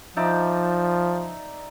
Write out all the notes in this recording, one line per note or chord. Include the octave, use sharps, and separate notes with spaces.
F3 D#4 D5 E5